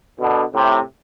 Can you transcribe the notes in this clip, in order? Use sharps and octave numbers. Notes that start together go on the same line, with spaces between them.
B2 D3
A2 C3